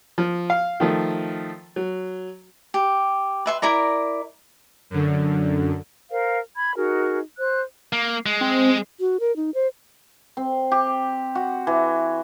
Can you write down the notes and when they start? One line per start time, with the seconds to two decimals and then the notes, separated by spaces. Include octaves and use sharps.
0.18 F3
0.50 F5
0.80 D#3 F3 A3
1.76 F#3
2.74 G4
3.46 B4 E5 C6
3.62 E4 A#4 D5 A#5
4.90 F#2 D3
6.11 A#4 C5 F5
6.56 B5 G#6
6.76 D#4 F#4 G#4 A#4
7.38 C5 F#6
7.93 A#3
8.26 G#3
8.41 C4
9.00 F#4
9.20 A#4
9.36 D#4
9.54 C5
10.37 C4
10.72 G4
11.35 F#4
11.67 E3